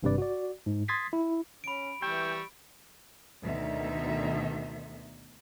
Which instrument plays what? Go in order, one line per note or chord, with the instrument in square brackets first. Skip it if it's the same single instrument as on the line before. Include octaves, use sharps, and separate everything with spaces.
[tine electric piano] G#1 G2 C3 G3 B4 D5
F#4 D5
G#2
C6 D#6 G#6 A6 B6 C7
E4
[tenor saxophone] C#4 [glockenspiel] B5 D7
[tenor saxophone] E3 [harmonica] G3 C#6 E6 [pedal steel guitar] G5
[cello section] D2 B2 D3 D#3 D#4 E5